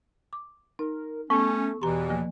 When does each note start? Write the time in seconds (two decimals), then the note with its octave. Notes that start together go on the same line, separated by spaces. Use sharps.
0.33 D6
0.79 D#4 A#4
1.30 A3 B3 C#4 A4 C#6
1.82 E2 B2 E3 G4 A#5 C6
2.10 F3 A#3